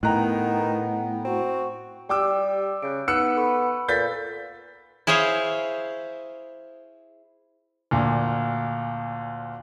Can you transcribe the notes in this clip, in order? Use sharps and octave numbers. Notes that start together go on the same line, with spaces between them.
A2 D#3 B3 G5 A#5 F#6
C4 F#4
G3 G4 D5 G5 D6 E6
C#3 F#6 G6 D7
B3 D#4 D6 E6 F#6 C#7
A4 B5 C#6
A#2 A4 B4 G6 A6 B6
E4 G#4 C5 C#5 F5
D2 A#2